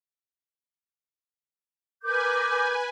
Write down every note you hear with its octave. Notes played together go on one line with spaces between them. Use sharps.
A#4 B4 G#5 D6 G6